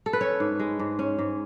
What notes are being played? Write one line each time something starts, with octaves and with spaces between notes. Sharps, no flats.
A4
B4
C#4 C#5
G#2
G#3
G#2
C#4
G#2